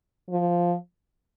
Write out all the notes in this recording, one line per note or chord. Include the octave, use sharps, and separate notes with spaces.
F3